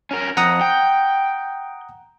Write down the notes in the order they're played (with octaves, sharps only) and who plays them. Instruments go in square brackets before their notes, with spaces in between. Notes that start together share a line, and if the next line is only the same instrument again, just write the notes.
[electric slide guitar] C#4 A#4
[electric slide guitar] F2 [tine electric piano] F#5 A#5 D#6
[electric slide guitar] G5